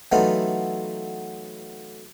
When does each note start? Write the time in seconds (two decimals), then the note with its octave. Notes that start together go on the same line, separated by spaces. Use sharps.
0.12 E3 F#3 A3 B3 D#4 F4